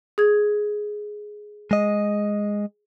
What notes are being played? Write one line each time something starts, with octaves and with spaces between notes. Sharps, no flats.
G#4 G#6
G#3 D#5